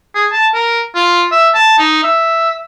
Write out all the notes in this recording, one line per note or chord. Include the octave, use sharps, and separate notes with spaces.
G#4
A5
A#4
F4
E5
A5
D#4
E5